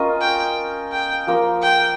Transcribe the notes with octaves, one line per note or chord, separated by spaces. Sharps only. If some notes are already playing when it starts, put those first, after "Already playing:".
Already playing: C#4 F4 A#4 D#5
G5
G5
F3 A#3 F4 A#4
G5